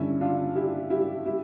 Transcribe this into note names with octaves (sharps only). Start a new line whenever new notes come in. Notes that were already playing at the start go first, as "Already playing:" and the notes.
Already playing: G2 D3 C#4 E4
D4 F4
E4 G4
E4 G4
E4 G4